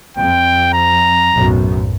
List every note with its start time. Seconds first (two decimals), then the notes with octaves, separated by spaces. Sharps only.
0.17 F2 G5
0.73 A#5
1.35 B1 F#2 A2